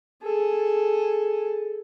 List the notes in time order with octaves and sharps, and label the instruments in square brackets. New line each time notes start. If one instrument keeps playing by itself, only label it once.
[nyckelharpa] G#4 A4